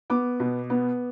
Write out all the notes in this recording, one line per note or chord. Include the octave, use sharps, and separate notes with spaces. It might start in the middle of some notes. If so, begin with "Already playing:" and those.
B3 D6
B2
B3